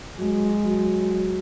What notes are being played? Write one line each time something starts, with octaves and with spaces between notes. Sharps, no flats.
F#3 G#3
F#3